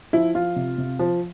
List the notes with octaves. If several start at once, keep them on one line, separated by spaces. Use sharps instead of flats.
F3 E4
F3 F4
C3
C3
F3